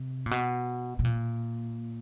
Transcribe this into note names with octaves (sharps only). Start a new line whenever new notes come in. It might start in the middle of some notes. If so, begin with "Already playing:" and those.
Already playing: C3
A#2
B2
B2
A#2